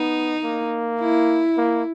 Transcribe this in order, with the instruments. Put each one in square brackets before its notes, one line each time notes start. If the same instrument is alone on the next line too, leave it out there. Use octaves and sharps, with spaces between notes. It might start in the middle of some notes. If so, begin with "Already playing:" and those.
Already playing: [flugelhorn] B3 [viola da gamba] D#4
[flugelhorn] A#3
[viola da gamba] E4
[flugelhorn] A#3